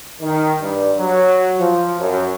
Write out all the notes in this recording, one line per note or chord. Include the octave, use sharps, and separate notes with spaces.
D#3
G2
F#3
F3
F#2